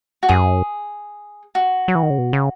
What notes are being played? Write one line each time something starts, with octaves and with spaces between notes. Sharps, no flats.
F#4
F#2 G#4
F#4
F#3
E3
D#3
C#3
B2
C#3